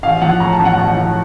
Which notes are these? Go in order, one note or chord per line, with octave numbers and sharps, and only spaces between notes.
A1 F5
F3 F#5
A2 A#5
A5
A1
F#5
A1 A5
F3